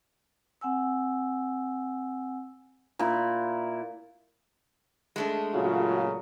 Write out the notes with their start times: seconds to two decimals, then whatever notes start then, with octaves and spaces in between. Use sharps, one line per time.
0.61 C4 F#5 G#5 E6
2.99 A#2 E4
5.16 G#3 A3 D4
5.54 A#2 C#3 F#3 F4 F#4